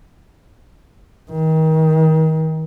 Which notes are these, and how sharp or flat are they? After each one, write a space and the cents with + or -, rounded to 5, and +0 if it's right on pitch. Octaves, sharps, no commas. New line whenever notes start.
D#3 +30